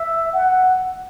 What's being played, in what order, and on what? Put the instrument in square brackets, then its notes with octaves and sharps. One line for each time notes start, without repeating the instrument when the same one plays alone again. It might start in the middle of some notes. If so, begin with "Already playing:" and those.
Already playing: [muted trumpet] E5
F#5